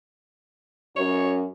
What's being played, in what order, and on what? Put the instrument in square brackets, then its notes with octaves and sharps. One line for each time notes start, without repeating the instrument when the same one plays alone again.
[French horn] F#2 [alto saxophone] C#5